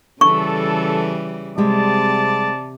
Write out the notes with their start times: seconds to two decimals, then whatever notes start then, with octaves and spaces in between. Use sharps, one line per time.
0.21 C#3 E3 G3 A4 C#6
1.58 C3 G3 G#3 C4 D5 A5